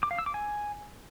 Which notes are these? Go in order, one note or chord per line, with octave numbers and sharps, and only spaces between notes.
D6
F5
E6
D6
G#5